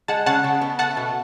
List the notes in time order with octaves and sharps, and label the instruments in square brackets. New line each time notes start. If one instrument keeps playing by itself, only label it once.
[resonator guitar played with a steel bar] G#3 [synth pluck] F#5 A5
[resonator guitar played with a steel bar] C#3 [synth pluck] F#5 A5
[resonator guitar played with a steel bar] C#3
B3
[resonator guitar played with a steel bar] A3 [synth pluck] F#5 A5
[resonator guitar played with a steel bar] B2